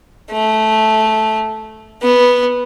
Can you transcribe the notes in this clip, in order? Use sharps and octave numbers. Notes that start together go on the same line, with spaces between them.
A3
B3